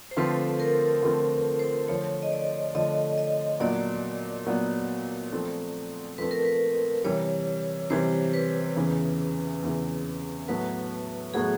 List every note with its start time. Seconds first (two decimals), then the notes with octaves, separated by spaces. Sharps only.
0.11 C5
0.17 D3 F3 A3 C4 F4 B4
0.60 A#4
1.03 D3 F3 A3 C4 F4
1.59 C5
1.88 D3 F3 A3 C#5
2.23 D#5
2.32 D5
2.74 D3 F3 A3 D#5
3.18 D#5
3.60 A#2 F#3 B3 D4 D5
4.46 A#2 F#3 B3 D4
5.32 F3 A3 C4
6.18 F3 A3 C4 B4
6.31 A#4
6.45 B4
7.04 C3 E3 G3 C#5
7.90 C3 E3 G3 C5
8.33 B4
8.76 E2 C#3 E3
9.62 E2 C#3 E3
10.48 A2 F#3 B3 B4
11.34 A2 F#3 B3 G#4